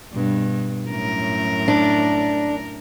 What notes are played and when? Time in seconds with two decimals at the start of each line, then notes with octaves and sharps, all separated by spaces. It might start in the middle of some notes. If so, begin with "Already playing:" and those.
0.13 G2 B2
0.88 F#2 A2 A#4
1.68 D4